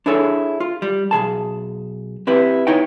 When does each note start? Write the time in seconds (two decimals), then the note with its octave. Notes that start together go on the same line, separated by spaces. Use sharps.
0.06 D4 E4 G#4 A4 C#5
0.60 F4
0.82 G3
1.11 B1 C#3 G#4 A5
2.27 C4 E4 G4 B4
2.67 B3 D#4 E4 C#5 D#5 G5